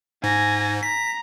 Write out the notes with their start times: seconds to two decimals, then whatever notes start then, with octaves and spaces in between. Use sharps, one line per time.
0.24 G#2 G#5 A#6
0.83 A#5 B6